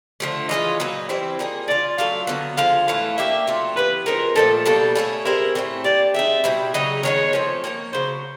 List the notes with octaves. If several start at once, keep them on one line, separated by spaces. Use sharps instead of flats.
D3 F3 A3
E3 G#3 C#4 F4 D#5
A#2 F#3 B3 D#4
E3 G3 C4 E4
F3 A#3 D#4 G#4
A3 C#4 F4 D5
F#3 A3 D4 F4 F5
D3 F#3 B3
D3 F3 G#3 F5
A2 E3 A3 F5
A#3 D4 G4 E5
F#3 A3 C4 F4
E3 G3 B3 B4
F3 G#3 C4 D#4 A#4
A#2 F3 A3 A4
B2 G3 A#3 D4 A4
A3 C#4 E4 G#4
G3 C4 E4 G#4 A#4
A2 F#3 A3 C4
A#3 D4 G4 D5
G#3 C4 D#4 E5
B2 G3 C4 E4
C#3 F#3 B3 D#4 D#5
D#3 G#3 B3 D#4 C#5
F3 A3 C4
A#3 D#4 G#4 C#5
C#3 F#3 B3 C5